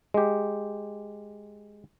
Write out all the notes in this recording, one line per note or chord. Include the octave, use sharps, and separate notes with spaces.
G#3 G4